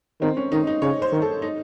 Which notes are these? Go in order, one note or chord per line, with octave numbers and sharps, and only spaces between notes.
D#3 C4
C#4
D#3 D#4
D#4
C#3 C#5
C5
D#3
A4
D#4